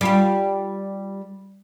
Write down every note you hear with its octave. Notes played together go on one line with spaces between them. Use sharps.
G3 F4 G4